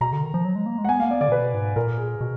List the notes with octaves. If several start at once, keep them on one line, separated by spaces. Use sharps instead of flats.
B2 A#5
D3
D#3
F3
F#3
G#3
A#3
G#3
F#5
B3 G#5
A#3 F5
B3 D5
D3 D5
A#2
B2 B4
G#2
A#2 A#4
G#4
B2